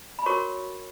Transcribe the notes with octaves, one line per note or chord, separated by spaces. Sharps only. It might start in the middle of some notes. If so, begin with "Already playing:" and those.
B5
F#4 A#4 C#5 C#6